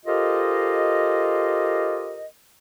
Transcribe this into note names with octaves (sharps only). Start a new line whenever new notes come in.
F4 G4 A4 A#4 C5 D#5